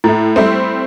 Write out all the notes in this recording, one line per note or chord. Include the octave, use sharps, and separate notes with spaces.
A2 A3 E4
G3 A3 C4